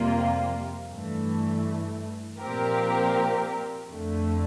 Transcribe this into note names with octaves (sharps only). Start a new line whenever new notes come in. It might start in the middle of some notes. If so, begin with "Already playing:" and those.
Already playing: F2 C3 G3 A#3 F4
G2 E3 A3
A#2 F3 C4 G4 A#4
F2 D3 A3